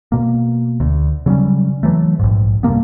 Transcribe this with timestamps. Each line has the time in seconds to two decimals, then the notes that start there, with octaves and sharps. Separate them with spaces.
0.12 B2 A#3
0.80 D2
1.26 C#3 F#3 G3 C#4
1.83 E3 F#3 A3
2.19 A#1 G#2
2.63 G2 C3 A#3 B3